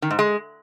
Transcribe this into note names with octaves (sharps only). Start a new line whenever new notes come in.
D#3
G#2
G#3